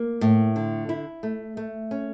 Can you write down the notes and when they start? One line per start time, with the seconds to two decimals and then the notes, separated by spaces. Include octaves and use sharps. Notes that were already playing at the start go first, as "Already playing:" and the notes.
Already playing: A#3
0.21 A2
0.56 D3
0.89 E4
1.23 A3
1.57 A3
1.91 C#4